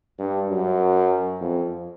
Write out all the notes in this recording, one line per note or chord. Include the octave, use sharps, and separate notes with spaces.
G2
F#2
F2